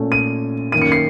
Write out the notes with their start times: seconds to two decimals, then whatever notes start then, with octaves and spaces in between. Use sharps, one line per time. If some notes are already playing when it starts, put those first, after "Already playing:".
Already playing: A#2 A3 C#4
0.12 D#7
0.72 F#2 D#3 A#3 C#4 D#7
0.82 C#7
0.92 C7